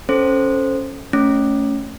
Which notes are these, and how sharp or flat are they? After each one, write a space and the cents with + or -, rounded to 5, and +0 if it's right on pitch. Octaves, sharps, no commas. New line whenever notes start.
C#4 -10 A4 -5 C5 +0
A3 +0 C#4 +0